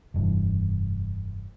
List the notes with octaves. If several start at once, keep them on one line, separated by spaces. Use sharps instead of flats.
F1 G2 E3